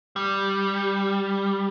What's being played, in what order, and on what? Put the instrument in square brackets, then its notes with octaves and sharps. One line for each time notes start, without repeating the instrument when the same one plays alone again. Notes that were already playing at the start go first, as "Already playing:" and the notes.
[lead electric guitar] G3